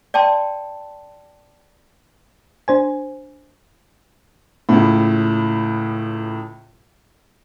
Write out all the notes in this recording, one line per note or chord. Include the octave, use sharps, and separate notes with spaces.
D5 G5 A5 C6
D4 C5 G#5
C#2 A2